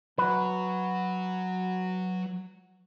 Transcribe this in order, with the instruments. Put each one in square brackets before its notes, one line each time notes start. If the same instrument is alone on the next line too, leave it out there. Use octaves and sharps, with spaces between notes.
[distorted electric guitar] F#3 [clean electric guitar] F#4 B4